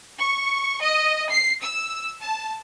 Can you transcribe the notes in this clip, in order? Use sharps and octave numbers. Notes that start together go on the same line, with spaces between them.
C#6
D#5
C7
E6
A5